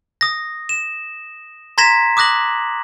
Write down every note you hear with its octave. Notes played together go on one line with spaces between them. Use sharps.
D#6 A#6
E7
A#5 C6 G#6 A#6 B6 E7
D6 D#6 F#6 A#6 F#7